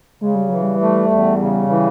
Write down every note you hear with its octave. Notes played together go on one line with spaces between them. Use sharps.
C#3 G#3
G3
E3 F#3
G3
A3
E2
C#3
E3